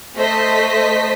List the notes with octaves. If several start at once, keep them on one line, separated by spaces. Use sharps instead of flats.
A3 C5 D#5 B6